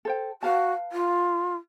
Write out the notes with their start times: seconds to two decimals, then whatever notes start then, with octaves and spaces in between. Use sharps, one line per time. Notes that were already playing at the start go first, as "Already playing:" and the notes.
0.05 A4 C5 G5
0.43 F#4 B4 F5 A5
0.92 F4